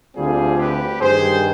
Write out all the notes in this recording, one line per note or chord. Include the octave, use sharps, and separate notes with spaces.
D2 D3 G3 C4 F4 G#4
G4 B4
G2 D#3 G3 G#4 C5